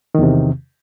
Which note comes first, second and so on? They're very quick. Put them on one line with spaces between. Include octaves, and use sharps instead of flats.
D#3 E2 C3